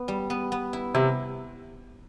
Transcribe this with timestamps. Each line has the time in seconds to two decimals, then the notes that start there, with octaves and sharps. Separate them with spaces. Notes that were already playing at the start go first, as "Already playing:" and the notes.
Already playing: B3
0.08 G3
0.30 B3
0.52 B3
0.73 E4
0.95 C3 E4